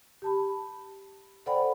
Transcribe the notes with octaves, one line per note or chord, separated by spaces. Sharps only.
G4 A5 B5
A4 C5 D5 F#5 G5 B5